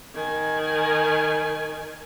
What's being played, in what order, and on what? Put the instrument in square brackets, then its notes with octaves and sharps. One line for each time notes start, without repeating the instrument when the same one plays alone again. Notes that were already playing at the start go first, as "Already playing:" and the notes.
[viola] D#3 G#5